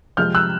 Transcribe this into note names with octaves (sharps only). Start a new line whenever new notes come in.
C3 F3 G#3 F6 G6
E6 F#6